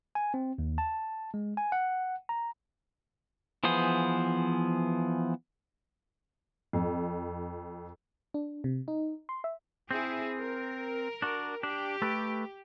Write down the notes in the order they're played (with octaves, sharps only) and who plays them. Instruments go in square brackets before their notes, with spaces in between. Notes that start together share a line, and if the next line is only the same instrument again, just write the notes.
[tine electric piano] G#5
C4
D#2
A5
G#3
G#5
F#5
A#5
[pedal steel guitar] E3 F3 B3 G#4 C5
[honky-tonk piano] F2
[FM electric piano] D4
C3
D#4
C6
E5
[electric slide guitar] C4 [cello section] E4 G#4
[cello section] A#4
[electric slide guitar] D4 F#4
[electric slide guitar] D4 [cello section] G4
[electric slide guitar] A3 A4 B4